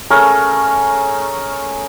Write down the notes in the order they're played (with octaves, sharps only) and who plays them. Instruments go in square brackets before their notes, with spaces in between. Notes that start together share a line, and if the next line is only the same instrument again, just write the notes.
[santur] A3 C#4 G#4 A#4